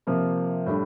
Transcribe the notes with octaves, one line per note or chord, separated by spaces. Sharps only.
C3 F3 A#3
A2 G3 D4